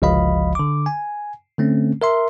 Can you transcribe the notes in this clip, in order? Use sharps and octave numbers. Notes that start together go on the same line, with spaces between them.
G1 C#2 F3 D#5 F5 B5
D3 D6
G#5
D3 A3 C4 C#4
A#4 E5 C6